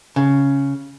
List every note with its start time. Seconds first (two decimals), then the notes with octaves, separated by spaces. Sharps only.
0.16 C#3